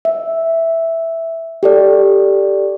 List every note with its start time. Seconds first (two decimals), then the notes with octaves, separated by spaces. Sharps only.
0.05 E5
1.63 G4 A4 D5